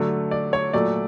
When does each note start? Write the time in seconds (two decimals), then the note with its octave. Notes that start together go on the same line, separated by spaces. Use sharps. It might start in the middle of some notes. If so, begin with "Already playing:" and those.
Already playing: D3 F#3 A3
0.31 D5
0.53 C#5
0.73 A#2 F#3 A3 D5